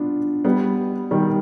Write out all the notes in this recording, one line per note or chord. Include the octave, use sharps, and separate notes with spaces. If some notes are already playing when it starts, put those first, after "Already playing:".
Already playing: B3 D4 F4
G3 B3
D#3 G3